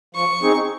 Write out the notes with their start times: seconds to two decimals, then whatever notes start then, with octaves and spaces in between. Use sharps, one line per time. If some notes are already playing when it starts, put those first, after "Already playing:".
0.15 F3 C#6
0.42 C4 D#4 G#4